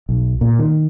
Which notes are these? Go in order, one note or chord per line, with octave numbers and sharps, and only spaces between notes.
B1
A#2
D#3